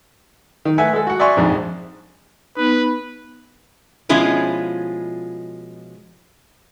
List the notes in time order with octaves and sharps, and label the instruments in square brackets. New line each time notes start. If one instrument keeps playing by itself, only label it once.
[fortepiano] D#3
A3 B4 E5 F#5 G#5
G#3 A4
F#4 F#5
D5 E5 F#5 G#5 C6 C#6
A#1 F2 G#2
[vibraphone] B3 D#4 [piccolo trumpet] B4
[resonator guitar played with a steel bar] B2 F3 G#3 C#4 E4 F4